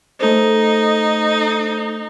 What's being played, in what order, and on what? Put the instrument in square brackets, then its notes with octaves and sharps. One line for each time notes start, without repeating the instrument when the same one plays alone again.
[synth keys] A3 A4 C5 [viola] D#4